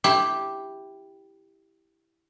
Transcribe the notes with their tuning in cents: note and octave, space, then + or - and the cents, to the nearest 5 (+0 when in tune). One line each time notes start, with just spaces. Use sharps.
E4 +0 G4 +0 C5 +35